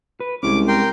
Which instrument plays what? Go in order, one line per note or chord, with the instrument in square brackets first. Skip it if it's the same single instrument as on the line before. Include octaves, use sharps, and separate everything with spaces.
[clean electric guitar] B4
[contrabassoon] C2 [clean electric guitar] G#3 C#4 [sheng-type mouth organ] D6
[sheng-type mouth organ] A#4 G5 C6